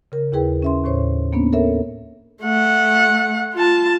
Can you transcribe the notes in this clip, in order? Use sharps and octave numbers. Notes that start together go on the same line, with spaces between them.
C#3 A#4
D#2 E4 G#4 B4 G5
C#4 E5 C6
D#2 A2 C5 C#5
A#3 B3 C#4 D4
A4 A#4 C#5 E5
A3 F#5
F4 A5